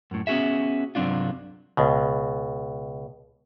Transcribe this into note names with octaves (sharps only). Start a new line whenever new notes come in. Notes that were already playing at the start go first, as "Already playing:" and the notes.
F#2 A2
B3 C#4 F#4 G#4 E5
C2 G2 F#3 C4 D4 F4
C#2 B2